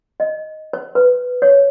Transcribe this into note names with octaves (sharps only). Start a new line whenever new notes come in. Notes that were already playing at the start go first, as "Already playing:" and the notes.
D#5
C5
B4
C#5